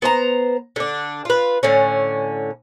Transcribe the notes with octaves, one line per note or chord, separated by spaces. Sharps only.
B3 C5 A#5
D3 D4
F4 B4
A2 D3 C#4